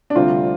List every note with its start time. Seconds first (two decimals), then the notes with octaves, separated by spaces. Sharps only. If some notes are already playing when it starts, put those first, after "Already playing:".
0.10 D4
0.15 D2 C3 G3 C4 F4